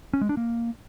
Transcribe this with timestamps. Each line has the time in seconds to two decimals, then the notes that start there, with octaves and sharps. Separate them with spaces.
0.13 C#4
0.21 G#3
0.29 D4
0.37 A#3